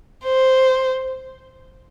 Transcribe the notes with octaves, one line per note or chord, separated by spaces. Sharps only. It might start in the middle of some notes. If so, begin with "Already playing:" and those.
C5